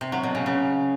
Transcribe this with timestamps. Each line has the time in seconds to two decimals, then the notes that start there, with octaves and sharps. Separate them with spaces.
0.01 C3
0.12 F#3
0.23 B2
0.35 C#3
0.46 C#3